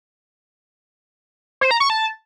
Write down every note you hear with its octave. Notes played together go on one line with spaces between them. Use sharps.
C5
A#5
C#6
A5